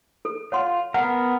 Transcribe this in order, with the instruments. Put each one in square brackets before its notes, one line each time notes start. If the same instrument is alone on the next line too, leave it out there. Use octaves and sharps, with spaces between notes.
[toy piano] A4
[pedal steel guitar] F4 [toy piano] C#5 F#5 C6
[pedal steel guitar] B3 A#4 [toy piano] F#5